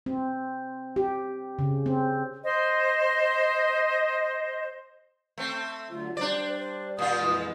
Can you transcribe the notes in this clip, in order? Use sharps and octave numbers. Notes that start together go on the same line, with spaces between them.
C4
G4
C#3
C4
C5 D#5 C6
A3 C4
D3 F#3 A3 F4
G3 D4 C5 D5
C5
A#2 F4 D#6
F2 E3 G#3